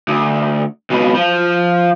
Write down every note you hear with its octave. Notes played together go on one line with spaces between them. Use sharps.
D2
C#2 B2
F3